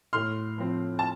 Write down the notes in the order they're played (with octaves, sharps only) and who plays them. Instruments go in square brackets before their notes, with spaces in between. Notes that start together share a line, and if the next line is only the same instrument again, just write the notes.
[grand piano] A2 C6 F6
F3 C4
A5